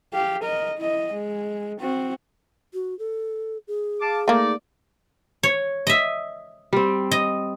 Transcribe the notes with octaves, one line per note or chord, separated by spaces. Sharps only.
G4 F5
A#4 D#5
E4 D#5
G#3
C4 F#4
F#4
A4
G#4
F5 A5 D6
A3 A#3 D#4 D5
C#5
D#5 E5
G3 C4
D#5